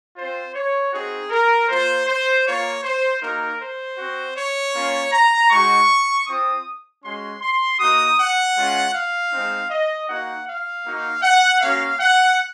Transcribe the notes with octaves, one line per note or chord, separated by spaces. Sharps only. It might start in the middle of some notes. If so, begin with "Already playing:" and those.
C4 F4 C5
C#5
C4 D#4 F#4 G#4
A#4
A#3 F4 C5
C5
A#3 F4 C#5
C5
A#3 D#4 F#4 A#4
C5
C4 F#4
C#5
A#3 C#4 F4
A#5
G#3 D#4 F#4 C#6
C4 F4 D#6
G#3 C#4 F#4 C6
C6
A#3 D#4 F#4 D#6
F#5
G#3 C#4 F4
F5
G#3 C4 D#4
D#5
A#3 D#4 F#4 F#5
F5
A#3 D#4 F#4
F#5
A#3 C#4 F#4 F5
F#5